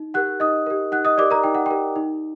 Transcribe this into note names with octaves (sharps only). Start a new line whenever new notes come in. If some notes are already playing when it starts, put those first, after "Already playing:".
Already playing: D#4
G4 A#4 F#5 F#6
D#4 D#5 D#6
G4 A#4
D#4 F#5 F#6
D#5 D#6
G4 A#4 D5 D6
A#4 A#5
D#4 G5
F#5
G4 A#4 G5
D#4